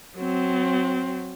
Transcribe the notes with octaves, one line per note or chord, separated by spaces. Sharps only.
F#3 C4